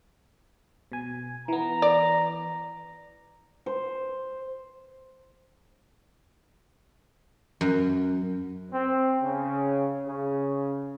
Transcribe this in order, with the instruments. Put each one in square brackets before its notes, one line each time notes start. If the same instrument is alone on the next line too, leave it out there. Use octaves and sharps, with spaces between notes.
[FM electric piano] B2 G#5
[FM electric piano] E3 B3 [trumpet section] A#5
[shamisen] D5
[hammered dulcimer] C5
[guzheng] F#2
[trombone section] C4
C#3
C#3